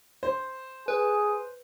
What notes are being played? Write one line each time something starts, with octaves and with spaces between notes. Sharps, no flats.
C5
G#4 B4